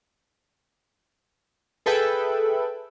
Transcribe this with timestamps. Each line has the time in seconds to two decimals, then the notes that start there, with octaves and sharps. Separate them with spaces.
1.86 G#4 A4 B4 E5 G5 B5